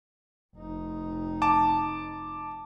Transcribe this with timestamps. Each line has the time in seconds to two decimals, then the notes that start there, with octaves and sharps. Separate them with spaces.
0.56 F1 D#4
1.42 A5 D6